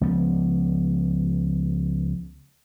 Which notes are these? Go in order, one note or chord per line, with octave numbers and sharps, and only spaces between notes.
C#2 F3 B3